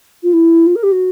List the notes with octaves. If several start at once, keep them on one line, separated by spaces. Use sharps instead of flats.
F4
E4
F4
A#4
G4
F#4